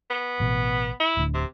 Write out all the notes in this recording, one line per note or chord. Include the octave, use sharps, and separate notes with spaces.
B3
A1 B2
E4
D1 D2 D3
C3